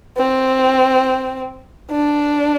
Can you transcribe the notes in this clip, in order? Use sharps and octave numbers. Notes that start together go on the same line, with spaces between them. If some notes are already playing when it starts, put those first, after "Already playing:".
C4
D4